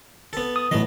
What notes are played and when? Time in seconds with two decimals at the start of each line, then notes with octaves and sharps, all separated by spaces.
0.33 B3 A4
0.56 D#6
0.71 A2 E3 F#3 B3 D#5